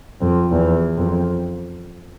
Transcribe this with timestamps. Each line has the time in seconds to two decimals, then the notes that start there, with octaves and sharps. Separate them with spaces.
0.21 F2
0.52 E2
0.98 F2